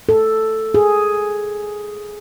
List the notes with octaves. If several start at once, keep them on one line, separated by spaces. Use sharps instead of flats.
A4
G#4